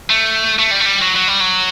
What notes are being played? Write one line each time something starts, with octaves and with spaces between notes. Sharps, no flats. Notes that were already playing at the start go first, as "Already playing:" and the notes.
A3
A3
G3
A3
G3
F#3
F#3
G3
F#3